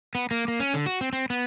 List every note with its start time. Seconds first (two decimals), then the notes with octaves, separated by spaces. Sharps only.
0.15 B3
0.31 A#3
0.48 A#3
0.60 C#4
0.74 D3
0.86 F#4
1.01 C4
1.13 C4
1.30 B3